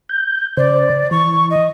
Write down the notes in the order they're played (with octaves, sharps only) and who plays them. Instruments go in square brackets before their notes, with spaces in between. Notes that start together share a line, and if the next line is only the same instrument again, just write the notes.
[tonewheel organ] G6
[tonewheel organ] C#3 C5 [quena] D5
[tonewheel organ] E3 [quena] C#6
[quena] D#5